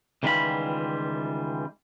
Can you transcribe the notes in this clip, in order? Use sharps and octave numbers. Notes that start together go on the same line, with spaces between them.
C#2 D#3 E3 G3 F4 B5